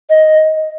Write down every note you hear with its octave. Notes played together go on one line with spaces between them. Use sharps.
D#5